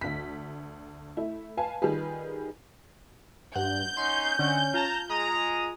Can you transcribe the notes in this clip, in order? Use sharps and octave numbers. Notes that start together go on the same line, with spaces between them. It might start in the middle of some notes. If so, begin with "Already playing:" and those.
D2 B6
A3 E4
B4 F5 G#5 A5
D#3 G3 F4 G#4 B4
G2 F#5 G6
C#4 D#4 C6
D3 C4 C#4 D#4 F#5
F4 A5 A#5
G#3 A#5 D#6